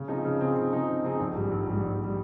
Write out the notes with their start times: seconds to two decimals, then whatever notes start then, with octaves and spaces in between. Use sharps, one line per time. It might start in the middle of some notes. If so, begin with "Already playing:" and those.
Already playing: C#3
0.08 F3 C4 D#4 G#4
0.25 C#3
0.40 F3 C4 D#4 G#4
0.56 C#3
0.72 F3 C4 D#4 G#4
0.88 C#3
1.03 F3 C4 D#4 G#4
1.20 A#1
1.35 G#2 G3
1.51 A#1
1.67 G#2 G3
1.83 A#1
2.03 G3